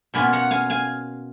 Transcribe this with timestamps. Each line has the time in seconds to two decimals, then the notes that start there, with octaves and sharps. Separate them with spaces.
0.14 B2 A#3 C#4 F4 G#5 B5
0.33 F#5 A#5
0.51 F5 G#5
0.70 F5 G#5